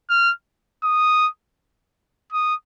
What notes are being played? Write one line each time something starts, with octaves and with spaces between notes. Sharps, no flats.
F6
D#6
D#6